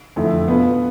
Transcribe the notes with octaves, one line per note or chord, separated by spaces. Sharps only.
F2 D3 A3 E4
B2 B3 F4 B4